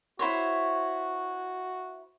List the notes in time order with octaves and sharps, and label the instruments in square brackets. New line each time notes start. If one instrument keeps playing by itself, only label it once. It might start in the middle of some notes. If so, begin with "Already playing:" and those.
[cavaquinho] E4 C5 C#5 [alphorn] F#4